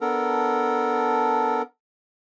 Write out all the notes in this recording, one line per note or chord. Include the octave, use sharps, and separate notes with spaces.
B3 D4 A4 A#4